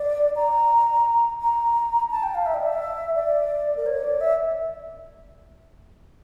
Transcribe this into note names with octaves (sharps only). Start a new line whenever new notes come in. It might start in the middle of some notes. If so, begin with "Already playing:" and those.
Already playing: D5
A#5
A#5
A5
G5
F5
E5
D5
E5
D5
A#4
C#5
D5
E5